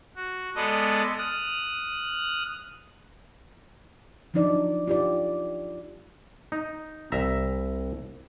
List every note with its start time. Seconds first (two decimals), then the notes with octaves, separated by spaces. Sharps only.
0.15 F#4
0.56 G#3 B3 A4 D5 D#5
1.18 D#6 F6 F#6
4.34 F3 F#3 D4 D#4 D5
4.88 F4 G4 D5
6.52 D#4
7.12 C2 E5 A#5